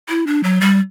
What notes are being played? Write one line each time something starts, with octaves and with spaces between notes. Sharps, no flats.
E4
D4
F#3
G3